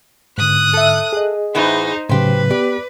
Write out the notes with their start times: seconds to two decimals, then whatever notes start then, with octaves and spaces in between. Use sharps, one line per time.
0.38 G#2 D3 D#6 F#6
0.73 A4 E5
1.13 G#4 D#5
1.55 A2 E3 B3 D#4 C5
2.09 A2 C#3 F#3 G4 B4 C5
2.50 B3 G4 D5